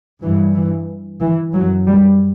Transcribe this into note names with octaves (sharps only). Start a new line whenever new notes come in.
G2 E3
E3
E3
F#2 F#3
G3